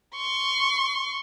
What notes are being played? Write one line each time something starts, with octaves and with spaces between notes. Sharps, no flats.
C6 C#6